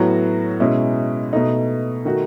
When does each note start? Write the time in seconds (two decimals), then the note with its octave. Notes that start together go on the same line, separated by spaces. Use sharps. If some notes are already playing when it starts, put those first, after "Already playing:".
Already playing: A2 F#3 B3 F#4
0.60 B2 G#3 C#4 E4
1.33 B2 A3 D#4
2.05 D#3 A3 D#4 F#4